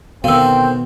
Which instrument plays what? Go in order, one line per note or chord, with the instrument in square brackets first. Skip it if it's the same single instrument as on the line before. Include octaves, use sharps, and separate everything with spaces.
[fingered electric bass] B2 [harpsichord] D3 D#3 [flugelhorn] C4 [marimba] F5 E6